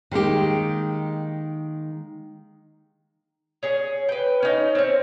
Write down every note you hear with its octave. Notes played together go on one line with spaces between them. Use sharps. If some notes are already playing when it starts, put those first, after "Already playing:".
D#3 G#3 A#3 G4
C#4 G#4
B4 G5
C#4 D#4
C4 C#4